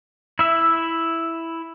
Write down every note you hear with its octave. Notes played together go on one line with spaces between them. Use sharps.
E4 E5